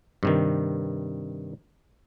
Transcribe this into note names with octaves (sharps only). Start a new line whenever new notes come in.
G2 C3 D#3